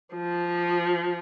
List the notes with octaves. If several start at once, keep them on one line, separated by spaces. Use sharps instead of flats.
F3